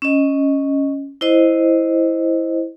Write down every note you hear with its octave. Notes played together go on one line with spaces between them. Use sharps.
C#4 D#5
E4 C5 D#5